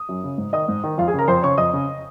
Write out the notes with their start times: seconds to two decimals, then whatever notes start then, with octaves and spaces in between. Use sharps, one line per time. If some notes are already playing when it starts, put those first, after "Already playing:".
Already playing: D#6
0.09 F#2
0.24 C#3
0.38 G#2
0.53 D#3 D#5 D#6
0.68 G#2
0.84 D#3
0.98 F2 F4 F5
1.08 G#4 G#5
1.14 C#3 A#4 A#5
1.28 F2 C5 C6
1.43 C#3 C#5 C#6
1.58 F2 D#5 D#6
1.73 C#3